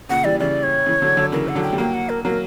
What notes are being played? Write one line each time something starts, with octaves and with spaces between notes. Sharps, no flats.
A#2 C#3 F#5
E3 G3 D5
C#3 E3 D5
C#5
C#3 E3
D3 F#3
D3 F#3
C#3 E3 A#4
F#5
D3 F#3
G5
G3
F#3 A#3 G5
F#5
A#4
F#3 A#3 A#4